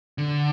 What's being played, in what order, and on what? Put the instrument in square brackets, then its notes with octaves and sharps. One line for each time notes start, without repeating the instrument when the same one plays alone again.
[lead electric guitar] D3